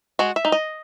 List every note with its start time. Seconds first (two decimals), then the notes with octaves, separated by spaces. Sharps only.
0.19 G#3 F#4
0.36 E5
0.45 D#4
0.52 D#5